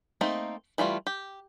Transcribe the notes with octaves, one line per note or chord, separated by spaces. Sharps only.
A3 A#3 C4 D#4
E3 G3 A3 F4
G4